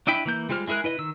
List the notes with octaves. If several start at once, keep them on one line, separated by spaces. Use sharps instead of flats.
D4 E4 D#5 G5 B5
E3 A#3 G6
G3 G#3 F4 C5 F6
G#3 E4 G#4 A#4 F#6
E4 B4 D#5
D#3 E6